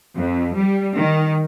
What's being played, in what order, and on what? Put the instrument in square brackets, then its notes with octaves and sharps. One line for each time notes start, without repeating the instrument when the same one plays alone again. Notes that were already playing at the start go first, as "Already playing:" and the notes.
[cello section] F2
G3
D#3